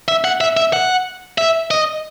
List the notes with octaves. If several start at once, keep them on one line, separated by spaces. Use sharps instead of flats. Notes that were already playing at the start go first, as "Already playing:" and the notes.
E5
F#5
E5
E5
F#5
E5
D#5